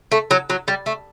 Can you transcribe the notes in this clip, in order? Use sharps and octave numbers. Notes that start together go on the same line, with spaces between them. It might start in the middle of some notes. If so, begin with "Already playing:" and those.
A3
F#3
F#3
G3
A3